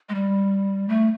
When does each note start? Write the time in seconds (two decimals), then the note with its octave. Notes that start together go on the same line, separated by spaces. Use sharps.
0.09 G#3
0.15 G3
0.88 A3